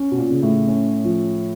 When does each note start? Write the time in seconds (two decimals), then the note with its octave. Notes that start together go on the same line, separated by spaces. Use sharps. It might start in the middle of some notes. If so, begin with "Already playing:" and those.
Already playing: C#4
0.11 B2
0.18 A#2
0.30 C#3
0.43 A2
0.68 C#4
1.04 F3